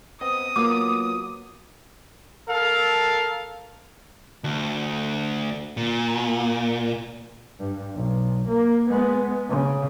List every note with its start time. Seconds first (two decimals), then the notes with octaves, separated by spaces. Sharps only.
0.21 B3 C4 D#5 D#6
0.56 F#3 A#3 B3 F4 D6
2.49 A4 A#4 F5
4.44 D2
5.77 A#2
7.60 G2
7.95 B1
8.49 A#3
8.90 G#3 B3
9.49 C#3